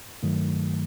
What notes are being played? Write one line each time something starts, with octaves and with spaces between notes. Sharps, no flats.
G2 D#3 F#3 A3